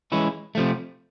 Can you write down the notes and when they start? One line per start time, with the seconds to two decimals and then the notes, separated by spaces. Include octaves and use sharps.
0.12 E3 G#3 C#4 E4
0.55 C3 F3 A3